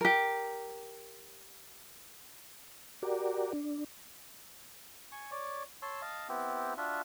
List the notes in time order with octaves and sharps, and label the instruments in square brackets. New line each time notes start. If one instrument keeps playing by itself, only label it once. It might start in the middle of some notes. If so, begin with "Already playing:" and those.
[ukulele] G4 A#4
[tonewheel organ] F#4 G4 A#4 D5
D4
[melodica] G#5 C#6
C#5 D5
C#5 A5 C6 E6
D#5 F5 A5
B3 C4 E4 G4
D4 F4 F#4 E5